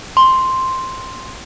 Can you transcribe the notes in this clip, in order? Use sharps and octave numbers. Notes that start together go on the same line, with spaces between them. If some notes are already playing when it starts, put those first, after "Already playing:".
C6